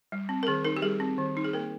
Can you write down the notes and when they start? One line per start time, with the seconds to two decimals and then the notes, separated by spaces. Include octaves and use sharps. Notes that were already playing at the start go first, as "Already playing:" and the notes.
0.12 G3
0.29 C4
0.43 A#4
0.47 D#3 G#4
0.64 D#4 A#4
0.77 G4
0.82 G3 G#4
1.00 C4
1.18 D#3
1.37 D#4
1.44 G#4
1.53 A#3 A#4